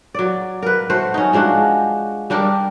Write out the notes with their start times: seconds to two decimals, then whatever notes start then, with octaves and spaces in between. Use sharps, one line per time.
0.15 F#3 D5
0.62 A#4 B4
0.90 A3 F#4 C5
1.14 C#4 D#4
1.33 F3 G#3 D4 F#4
2.30 G3 D4 G4 A#4